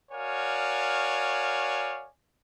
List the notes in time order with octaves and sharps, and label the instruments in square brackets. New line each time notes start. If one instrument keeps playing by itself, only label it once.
[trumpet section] F#4 A#4 C#5 D5 F5 G#5